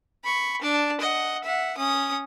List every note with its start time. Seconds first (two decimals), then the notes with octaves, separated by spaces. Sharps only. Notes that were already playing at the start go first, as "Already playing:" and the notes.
0.24 B5 C#6
0.61 D4 A5
1.01 D#5 F#5
1.44 E5 F#5
1.77 C#4 D#6